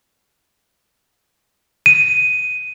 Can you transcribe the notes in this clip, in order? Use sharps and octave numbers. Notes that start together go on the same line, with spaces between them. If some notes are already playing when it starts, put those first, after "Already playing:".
D#7